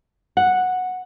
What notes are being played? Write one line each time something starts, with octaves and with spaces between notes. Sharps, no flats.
F#5